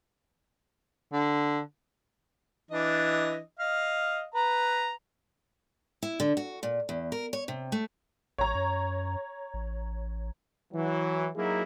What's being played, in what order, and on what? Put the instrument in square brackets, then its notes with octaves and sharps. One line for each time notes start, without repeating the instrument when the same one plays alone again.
[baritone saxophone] D3
[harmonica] E3 D4 D#5
D#5 F5
B4 A#5
[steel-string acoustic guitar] E4
D3
F#4
A#2
E2
A#4
C#5
C3
A3
[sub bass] A1 [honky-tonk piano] C#5 A#5
[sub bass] F#2
A1
[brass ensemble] E3 F#3
F#3 A#3 D#4 E4 F#4 G#4